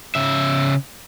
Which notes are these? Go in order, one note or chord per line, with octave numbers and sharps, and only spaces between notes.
C#3 E5